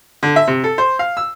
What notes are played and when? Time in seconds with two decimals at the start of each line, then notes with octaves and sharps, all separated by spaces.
0.23 D3
0.36 E5
0.48 C3
0.64 A4
0.78 C5
0.99 F5
1.17 E6